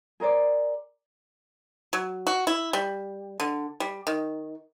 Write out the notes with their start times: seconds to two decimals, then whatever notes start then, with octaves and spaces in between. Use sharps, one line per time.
0.20 G#4 A#4 C5 D5
1.93 F#3
2.27 F#4
2.47 E4
2.73 G3
3.40 D3
3.80 G3
4.07 D#3